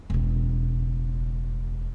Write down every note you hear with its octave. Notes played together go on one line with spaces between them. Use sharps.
E1 C#3